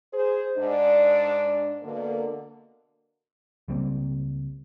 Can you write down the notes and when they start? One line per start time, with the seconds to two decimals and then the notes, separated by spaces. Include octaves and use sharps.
0.12 G#4 C5
0.57 G#2 D4
1.83 B2 D3 A#3
3.68 C#2 G3 A#3 C4